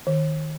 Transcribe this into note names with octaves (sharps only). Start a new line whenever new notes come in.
D#3